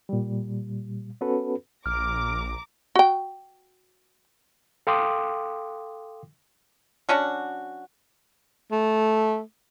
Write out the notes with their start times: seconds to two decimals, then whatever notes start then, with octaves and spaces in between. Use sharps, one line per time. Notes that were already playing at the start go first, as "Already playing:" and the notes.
0.09 A#2 G3
1.21 B3 C#4 F#4 A4 B4
1.86 A#1 A#5 D6 F6
2.95 F#4 G5
4.87 A4 F5 G5 C6 D6 D#6
7.09 F#3 C#4 D4 F#4
8.72 A3